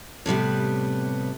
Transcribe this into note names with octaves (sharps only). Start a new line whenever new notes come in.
A2 C3 G3 B3